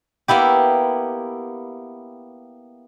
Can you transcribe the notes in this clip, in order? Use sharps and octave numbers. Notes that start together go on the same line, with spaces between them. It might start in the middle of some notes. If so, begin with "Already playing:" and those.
A#3 B3 E4 G4